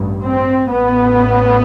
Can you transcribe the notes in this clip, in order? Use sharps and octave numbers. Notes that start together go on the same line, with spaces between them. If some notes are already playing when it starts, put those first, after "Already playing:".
Already playing: A1 G2
C4
A1 A2 B3